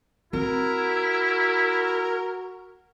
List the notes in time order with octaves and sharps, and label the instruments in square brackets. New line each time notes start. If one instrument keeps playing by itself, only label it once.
[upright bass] C4 [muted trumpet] E4 [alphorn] F#4 [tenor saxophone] A#4